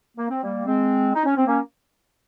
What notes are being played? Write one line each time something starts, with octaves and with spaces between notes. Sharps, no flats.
A#3
C4
G3 A#3
G#3 C4
D#4
C#4
C4
A#3 C#4